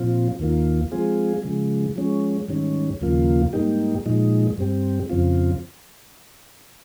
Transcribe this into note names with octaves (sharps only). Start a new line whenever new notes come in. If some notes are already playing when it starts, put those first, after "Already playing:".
Already playing: A#2 F3 C4 F4
D#2 D#3 A#3 F4
F3 G#3 C4 F4 G#4
C#3 F3 G#3
F3 G#3 C#4
G#2 D#3 G3 C#4
D#2 C#3 F3 A#3 F4
G#2 G3 A#3 D#4 G4
A#2 F3 G#3 D#4
G2 G3 C4 G4
F2 C#3 F3 C4 F4